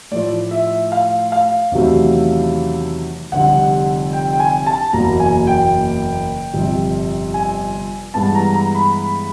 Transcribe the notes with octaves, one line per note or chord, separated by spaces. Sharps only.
A2 F3 A3 D5
E5
F5
F5
E2 C3 D#3 F#3 A3
F1 F2 D3 G3 F#5
G5
G5
G#5
A5
F#1 E2 B2 F#3 A#3 A#5
G#5
G5
G1 F2 C3
G#5
G2 E3 G#3 B3 A5
A#5
A#5
B5